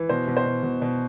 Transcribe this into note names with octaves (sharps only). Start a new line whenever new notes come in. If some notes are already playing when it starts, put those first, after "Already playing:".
Already playing: E3
B2 C5
B2
C5
B2
B2
B2